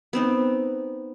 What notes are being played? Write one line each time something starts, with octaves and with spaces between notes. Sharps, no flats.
B3 C4 D#4